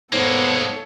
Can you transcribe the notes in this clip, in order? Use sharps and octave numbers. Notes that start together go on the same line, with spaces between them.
G#2 G#3 A#3 B3 A4 C#5